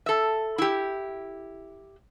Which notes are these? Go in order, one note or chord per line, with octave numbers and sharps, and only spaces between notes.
A4 E5
E4 G4